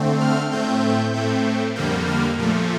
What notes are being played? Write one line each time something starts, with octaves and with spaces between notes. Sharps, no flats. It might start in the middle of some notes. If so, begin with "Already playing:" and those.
Already playing: D3 A3 C4
F6
A2 A3 C4 G6
A2 A3 C4
F2 D3 G3 A#3 G6
F6
A#2 F3 A3